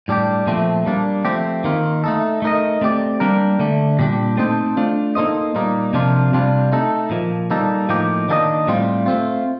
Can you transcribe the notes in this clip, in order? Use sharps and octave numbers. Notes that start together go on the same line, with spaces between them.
A2 G3 D4 G4
A#2 F3 A3 C4
G3 A#3 D4
F3 A3 C4 G4
D#3 A#3 F4
A3 D#4 A4
A3 D#4 A#4 D#5
A3 C4 G4 D5
G3 A#3 D4 G4 A#4
D3 A3 D4
A#2 G3 D4 G4
A3 C4 D#4 A4 C5
A3 D4 F4
A#3 D#4 A4 C5 D#5
A#2 G3 A#3 D#4
C3 F3 A#3 D4 F4
C3 G3 D4 F4
A3 D#4 A4
A#2 F3 A#3
G3 A#3 D#4 A4
A2 F3 A#3 D#4 G4
D#3 A#3 D4 A4 D#5
A2 G3 C4 F4
A3 C4 F4